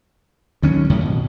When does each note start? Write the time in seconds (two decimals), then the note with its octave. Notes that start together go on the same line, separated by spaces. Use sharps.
0.62 D2 D#3 F#3 C#4
0.90 F#2 A2 C3
1.06 B2